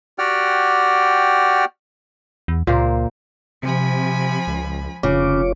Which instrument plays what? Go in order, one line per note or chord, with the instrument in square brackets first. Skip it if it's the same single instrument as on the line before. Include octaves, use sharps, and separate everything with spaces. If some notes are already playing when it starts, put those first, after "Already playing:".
[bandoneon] F#4 G4 D5 F#5 G5 F6
[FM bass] E2
[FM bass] C#2 [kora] A#2 A#3 C5
[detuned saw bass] C3 [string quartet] F3 G#5 B5
[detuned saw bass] C#2
[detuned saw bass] F1 [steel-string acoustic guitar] C#3 [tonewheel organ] F4 C#5 D6